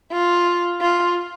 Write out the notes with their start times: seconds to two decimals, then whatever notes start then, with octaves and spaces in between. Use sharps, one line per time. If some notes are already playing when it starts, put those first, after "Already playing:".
0.12 F4
0.81 F4